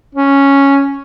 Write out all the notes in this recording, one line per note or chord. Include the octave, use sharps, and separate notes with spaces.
C#4